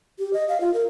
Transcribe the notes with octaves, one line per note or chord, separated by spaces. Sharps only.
G4
D#5
F5
F4
A#4